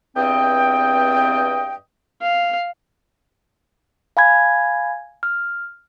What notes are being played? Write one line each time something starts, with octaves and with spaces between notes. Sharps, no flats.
E2 G2 C4 D#5 G5
F5
F5 G#5 B5 G#6
F6